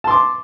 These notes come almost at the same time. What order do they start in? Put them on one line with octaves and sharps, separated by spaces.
A5 C6 D6